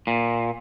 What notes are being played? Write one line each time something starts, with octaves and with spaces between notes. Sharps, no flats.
A#2